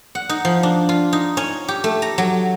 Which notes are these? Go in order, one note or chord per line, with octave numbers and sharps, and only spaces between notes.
F#5
D#4
F3
D4
F4
D#4
C#4
G4
A3
A#5
F#3